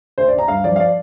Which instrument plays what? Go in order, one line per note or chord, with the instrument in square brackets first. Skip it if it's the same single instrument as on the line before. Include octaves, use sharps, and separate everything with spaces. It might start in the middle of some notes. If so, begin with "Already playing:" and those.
[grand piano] D2 C5
D5
D2
A#5
G2 F5
F3 D5
F5
D5